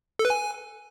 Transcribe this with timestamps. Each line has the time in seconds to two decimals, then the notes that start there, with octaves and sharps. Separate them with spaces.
0.19 A4
0.25 B4
0.30 G#5